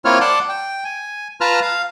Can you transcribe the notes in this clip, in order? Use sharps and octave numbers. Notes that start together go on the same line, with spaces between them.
A#3 C4 E4 F4 C#5 F6
D5 F#5 A5 C6 D6
G5
G#5
F4 B4 A5 A#5 F6
F5